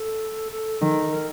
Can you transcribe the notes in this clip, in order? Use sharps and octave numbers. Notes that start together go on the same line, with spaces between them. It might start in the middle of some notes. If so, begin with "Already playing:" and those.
Already playing: A4
A4
D#3
A#4